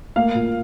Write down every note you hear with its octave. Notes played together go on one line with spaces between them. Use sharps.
A#3 F5
A#2